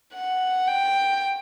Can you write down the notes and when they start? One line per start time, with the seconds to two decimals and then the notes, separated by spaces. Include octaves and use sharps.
0.14 F#5
0.68 G5